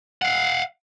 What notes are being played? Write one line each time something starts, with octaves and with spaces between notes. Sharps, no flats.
F5 F#5